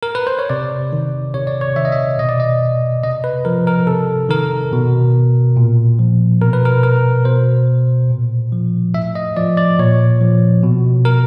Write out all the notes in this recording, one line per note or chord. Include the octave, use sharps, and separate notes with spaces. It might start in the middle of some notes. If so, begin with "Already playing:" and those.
A#4
B4
C5
C#5
C3 D5
D#3
C3 C#5
D5
C#5
D#3 E5
D#5
E5
B2 D#5
D5
D#5
C3 D#5
B4
F3 A#4
A#4
C3 A4
D#3 A#4
B2
A#2
F3
B2 A#4
B4
A#4
A#4
B2 C5
A#2
F3
A2 E5
D#5
F3 D5
D5
A#2 C#5
F3
B2
A#4